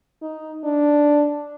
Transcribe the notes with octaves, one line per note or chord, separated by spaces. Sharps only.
D#4
D4